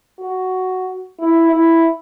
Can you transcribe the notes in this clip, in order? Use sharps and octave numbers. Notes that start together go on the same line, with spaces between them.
F#4
E4
E4